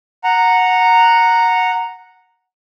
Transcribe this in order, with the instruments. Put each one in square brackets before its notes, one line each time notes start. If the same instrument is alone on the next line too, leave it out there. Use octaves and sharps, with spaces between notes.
[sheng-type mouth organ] F#5 A#5